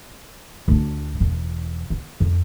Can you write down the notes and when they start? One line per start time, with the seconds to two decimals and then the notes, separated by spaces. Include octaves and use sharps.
0.68 D2 D4
1.20 E1 E2
1.90 B3
2.20 F2